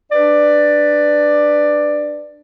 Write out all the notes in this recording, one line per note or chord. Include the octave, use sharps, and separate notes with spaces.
D4 B4 D5